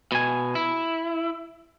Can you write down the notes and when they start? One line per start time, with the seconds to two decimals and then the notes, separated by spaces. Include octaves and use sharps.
0.12 B2 G#5
0.55 E4